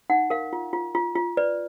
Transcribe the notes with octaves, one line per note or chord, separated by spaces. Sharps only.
D#4 F#5
A#4 F5
F4
F4
F4
F4
B4 D5